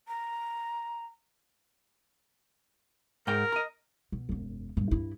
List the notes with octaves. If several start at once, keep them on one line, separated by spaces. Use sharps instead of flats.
A#5
G#2 A#4 G5 A#5
D#5 A#5
B2
E1 F#2
G2 A#2
G2 E4